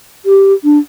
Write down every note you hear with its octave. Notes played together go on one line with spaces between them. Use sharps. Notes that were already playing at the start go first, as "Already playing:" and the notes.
G4
D4